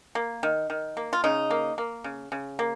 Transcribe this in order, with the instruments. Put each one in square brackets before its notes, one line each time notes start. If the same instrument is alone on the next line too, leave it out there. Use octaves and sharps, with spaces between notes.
[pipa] A#3
D#3
D#3
A#3
F4
C#3 D#4
A#3
A#3
C#3
C#3
A#3